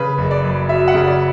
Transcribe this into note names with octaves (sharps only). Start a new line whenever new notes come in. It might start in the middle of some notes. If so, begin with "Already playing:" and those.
Already playing: C#3 B4
F#1
D5
F#2
F#3 E5
F#5
C#3
D5